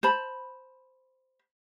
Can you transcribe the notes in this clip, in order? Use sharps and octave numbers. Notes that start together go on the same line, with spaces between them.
C5 A5 B5